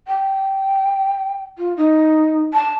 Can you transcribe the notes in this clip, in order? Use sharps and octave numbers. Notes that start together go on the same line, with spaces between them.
G5
F4
D#4
A5